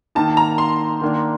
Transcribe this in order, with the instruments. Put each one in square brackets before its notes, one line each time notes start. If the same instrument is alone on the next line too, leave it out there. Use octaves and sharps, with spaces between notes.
[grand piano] D#3 A#3 D#4 [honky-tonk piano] A5
[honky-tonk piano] A#5
C6
[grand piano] D#3 A#3 D4